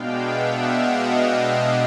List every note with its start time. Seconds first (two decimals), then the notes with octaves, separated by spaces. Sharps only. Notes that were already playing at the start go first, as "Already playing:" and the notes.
Already playing: B2 G#3 B3 D4 F5 G5
0.20 E5 F#5
0.67 D#5 F5